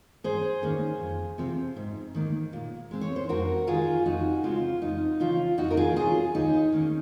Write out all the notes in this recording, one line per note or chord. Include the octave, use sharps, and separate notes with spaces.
G#2 G#4 C5
D#3 A#3 C#4
F2
C3 F3 C4
G#2
D#3 A#3
A#2
G#3 C4
C#5
C5
F2 F#4 A#4
D#3 G#3 F4 G#4
F2 D#4 F#4
C#3 G#3 C4 F4
F2 D#4
C#3 F3 F4
F2 D#4 F#4
A#4
F4 G#4
C3 F#3 F4 G#4
D#2 D#4
D#3 A#3 C#4